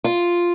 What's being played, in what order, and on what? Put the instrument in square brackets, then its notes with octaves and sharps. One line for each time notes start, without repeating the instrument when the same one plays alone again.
[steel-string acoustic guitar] F4